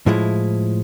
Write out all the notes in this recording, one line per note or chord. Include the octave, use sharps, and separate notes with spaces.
A2 F3 G#3 E4